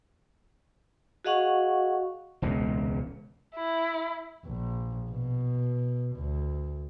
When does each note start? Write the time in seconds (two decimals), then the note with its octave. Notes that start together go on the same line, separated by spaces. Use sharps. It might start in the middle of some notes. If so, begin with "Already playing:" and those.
1.25 F#4 G#4 D#5 F5 F#5 C#6
2.42 E1 C#2 A#2
3.55 E4
4.46 A#1
5.10 B2
6.16 D2